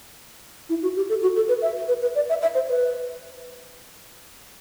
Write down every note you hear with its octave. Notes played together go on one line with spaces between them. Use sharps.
E4
F#4
G4
A4
F#4
A4
B4
E5
B4
B4
D5
E5
E5
C5
B4